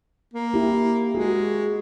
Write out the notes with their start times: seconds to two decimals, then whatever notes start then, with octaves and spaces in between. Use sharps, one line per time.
0.34 A#3
0.54 E4 G4
1.15 G#3 F#4 G#4